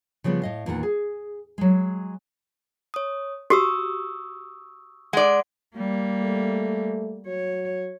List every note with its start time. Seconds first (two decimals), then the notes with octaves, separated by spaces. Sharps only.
0.24 C#3 F3 G3 B3
0.42 A2 D#5 F5
0.66 E2 A#2 D#3 A4 F#5
0.83 G#4
1.58 F#3 G#3
2.94 C#5 D#6
3.50 F#4 G4 C#6 D#6 E6
5.13 G#3 D5 F#5
5.77 G3 A#3
6.23 A3
7.27 F#3 C#5